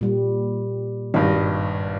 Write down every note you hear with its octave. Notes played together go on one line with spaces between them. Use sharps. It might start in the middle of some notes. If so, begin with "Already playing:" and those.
A#2 G3
G#1 G2 D#5